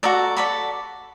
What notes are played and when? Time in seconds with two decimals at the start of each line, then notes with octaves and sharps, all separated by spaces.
0.03 F#4 A4 D5 A#5
0.37 F#4 A4 D5 B5